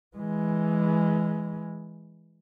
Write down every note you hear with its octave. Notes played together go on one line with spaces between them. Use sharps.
E3 G#3